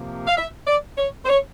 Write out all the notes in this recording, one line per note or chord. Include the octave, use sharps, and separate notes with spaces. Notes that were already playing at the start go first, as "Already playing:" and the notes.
Already playing: C3 F3 A#3
F5
E5
D5
C#5
C5
C#5